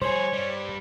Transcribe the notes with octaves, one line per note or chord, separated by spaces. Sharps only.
G3 G#4 C5 C#5
G3 D4